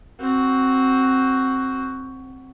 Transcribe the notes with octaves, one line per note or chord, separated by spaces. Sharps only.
C4 F#4